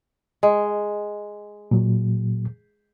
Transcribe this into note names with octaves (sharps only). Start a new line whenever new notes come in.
G#3
A#2 F#3